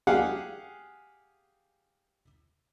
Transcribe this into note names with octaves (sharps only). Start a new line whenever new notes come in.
G4 G#4 F5 F#5